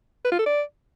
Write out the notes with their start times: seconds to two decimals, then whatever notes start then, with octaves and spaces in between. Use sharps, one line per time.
0.25 B4
0.32 F4
0.39 A4
0.46 D5